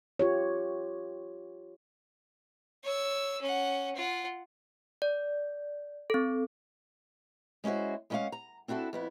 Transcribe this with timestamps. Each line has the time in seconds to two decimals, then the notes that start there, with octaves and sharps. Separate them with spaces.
0.19 F4 G4 C#5
2.84 C#5 E6
3.41 C#4 F#5
3.95 F4 F#5
5.02 D5
6.10 C4 A4
7.64 G#3 C#4 E4 F#4 C5
8.10 G#3 B3 C#4 D5 F5 F#5
8.32 A#5
8.68 C4 D4 E4 F#4 A4
8.93 F2 B3 E4